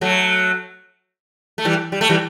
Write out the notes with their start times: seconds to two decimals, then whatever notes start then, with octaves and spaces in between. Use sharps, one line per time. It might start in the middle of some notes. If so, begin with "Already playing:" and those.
0.01 F#3 A3
1.58 A3
1.65 E3 G3
1.92 G3
2.01 A3
2.09 E3 G3